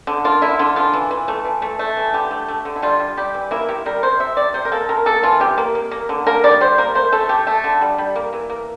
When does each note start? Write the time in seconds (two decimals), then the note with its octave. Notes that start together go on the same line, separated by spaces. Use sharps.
0.07 D3
0.24 A#3 F4
0.42 D3 E4
0.59 D3 F4
0.76 E3 F4
0.93 E3
1.11 E3
1.28 A3
1.44 E3
1.62 A3
1.79 A3
1.97 E3
2.13 D3 G4
2.31 A3
2.48 A3
2.65 D3
2.76 E4
2.82 G3 F4
3.00 G3
3.17 G3 G4
3.34 E3
3.51 A#3 E4
3.69 C3 G4
3.86 G3 A#4
4.03 C3 C5
4.20 C3 E5
4.37 C3 D5
4.54 C3 C5
4.65 A#4
4.72 A#3 A4
4.89 C3 A#4
5.06 A#3 A4
5.23 E3 F4
5.40 C3 G4
5.58 A#3
5.75 A#3
5.91 A#3
6.09 D3
6.27 A#3 A#4
6.44 G3 D5
6.61 G3 C5
6.78 A#3 A#4
6.95 A3 C5
7.12 A3 A4
7.29 A3 G4
7.47 A3 A4
7.64 D3
7.81 G3
7.98 G3
8.16 A#3
8.33 E3
8.50 A#3